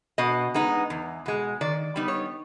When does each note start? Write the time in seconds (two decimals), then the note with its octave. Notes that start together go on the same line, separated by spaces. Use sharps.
0.18 B2 D#5
0.54 G#3 B3 D#4
0.90 E2
1.26 B2 G#3
1.61 D#3 D5
1.96 G3 B3 D#4
2.08 C#5